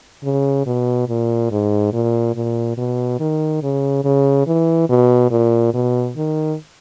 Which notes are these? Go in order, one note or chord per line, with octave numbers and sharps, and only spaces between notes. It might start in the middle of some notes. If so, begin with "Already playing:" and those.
C#3
B2
A#2
G#2
A#2
A#2
B2
D#3
C#3
C#3
E3
B2
A#2
B2
D#3